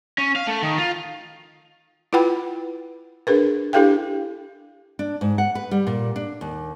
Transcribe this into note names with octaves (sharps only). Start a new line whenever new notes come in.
C#4
F5
A3
D#3
F4
E4 F4 B4 F#5 G5 B5
D4 G#4 A#4 B4
D4 E4 G4 A4 F5 G5
D4
G#2
F#5
B4
G3
A#2
D4
D#2